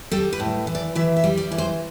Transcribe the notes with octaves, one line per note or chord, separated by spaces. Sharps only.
G3 A4
B4
A2
E3
D5
E3 E5
E5
G3
D5
E3
C5